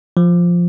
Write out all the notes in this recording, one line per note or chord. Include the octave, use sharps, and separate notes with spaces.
F3